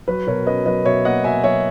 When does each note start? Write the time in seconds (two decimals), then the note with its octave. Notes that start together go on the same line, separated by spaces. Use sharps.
0.08 F#3 B4
0.27 B2 A#4 C#5
0.46 C#4 B4 D#5
0.66 F#3 B4 D#5
0.85 B2 C#5 E5
1.05 A#3 D#5 F#5
1.24 B2 E5 G#5
1.44 F#3 C#5 E5